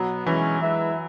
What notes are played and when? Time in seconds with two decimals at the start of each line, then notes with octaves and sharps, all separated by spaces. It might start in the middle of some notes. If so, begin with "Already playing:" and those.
Already playing: B2 F#3 B3
0.26 B2 E3 G#3 C#4
0.61 G#3 E4 B4 E5